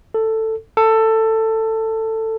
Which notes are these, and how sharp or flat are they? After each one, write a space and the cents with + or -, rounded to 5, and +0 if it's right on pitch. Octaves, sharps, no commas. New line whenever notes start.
A4 +10
A4 +15